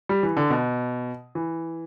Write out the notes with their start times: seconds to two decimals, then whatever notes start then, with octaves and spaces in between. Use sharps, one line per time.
0.09 G3
0.23 E3
0.37 D3
0.50 B2
1.35 E3